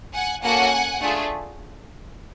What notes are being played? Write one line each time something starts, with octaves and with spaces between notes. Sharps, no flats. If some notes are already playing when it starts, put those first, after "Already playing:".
F#5 G#5
A#3 C#4 F#4 A4 F#5 G#5
A3 D4 F4 G#4